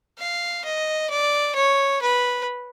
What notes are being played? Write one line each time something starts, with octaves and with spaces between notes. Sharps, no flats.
F5
D#5
D5
C#5
B4